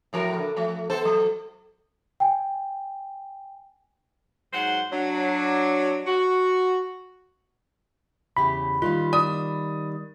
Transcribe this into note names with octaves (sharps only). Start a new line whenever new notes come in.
A2 F3 A#4
D3
F3 A3
B3 A4 C5
F#3
G5 G#5
G#2 F#3 C5 F#5
F#3 D4
F#4
E2 C#3 G4 B5
D#3 G3 A#3 F4
D5 D#6